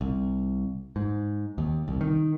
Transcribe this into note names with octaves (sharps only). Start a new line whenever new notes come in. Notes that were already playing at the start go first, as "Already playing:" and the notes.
C2
G#2
D#2
C2
D#3